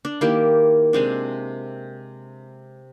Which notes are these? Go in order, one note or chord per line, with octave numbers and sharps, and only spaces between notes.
D4
D#3 A#3 E4 G4
C3 G#3 C4 D4